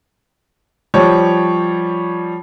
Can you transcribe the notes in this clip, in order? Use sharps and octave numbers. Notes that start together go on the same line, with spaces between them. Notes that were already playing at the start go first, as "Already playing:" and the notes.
F3 G3 C#5